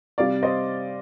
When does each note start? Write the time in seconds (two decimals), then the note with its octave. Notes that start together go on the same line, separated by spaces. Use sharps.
0.18 C3 G3 D5 F5
0.43 C5 D#5